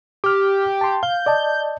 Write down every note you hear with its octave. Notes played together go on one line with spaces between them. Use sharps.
G4 D6 F6
A5 C6
F5 G6
D5 D#5 A5